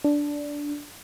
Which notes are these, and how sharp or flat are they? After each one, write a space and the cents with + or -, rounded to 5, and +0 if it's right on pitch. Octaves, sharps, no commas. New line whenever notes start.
D4 -10